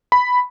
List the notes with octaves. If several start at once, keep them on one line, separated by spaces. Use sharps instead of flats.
B5